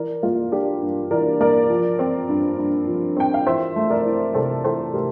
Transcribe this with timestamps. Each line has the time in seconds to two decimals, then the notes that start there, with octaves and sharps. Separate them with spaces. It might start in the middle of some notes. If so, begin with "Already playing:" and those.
Already playing: E3 A#4 D5
0.23 A#3 F4
0.52 D4 G4
0.82 G2
1.11 E3 A#4 D5
1.41 A#3 A#4 D5
1.70 F3
1.99 C4
2.29 G2
2.58 G2
2.87 F3
3.17 C4 G5
3.34 F5
3.47 E3 C5 E5
3.76 A3
3.90 A#4 D5
4.05 E4
4.35 C3 A4 C5
4.64 E3 A4 C5
4.94 A3 G4 A#4